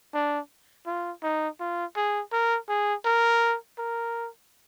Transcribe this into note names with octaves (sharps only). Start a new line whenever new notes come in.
D4
F4
D#4
F4
G#4
A#4
G#4
A#4
A#4